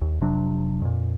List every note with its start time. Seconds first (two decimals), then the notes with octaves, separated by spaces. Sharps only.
0.01 D#2
0.21 F1 C3 F#3 D4
0.82 F2 A#2